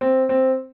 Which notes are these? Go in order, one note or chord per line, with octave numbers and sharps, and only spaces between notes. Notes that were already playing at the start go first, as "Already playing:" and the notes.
C4
C4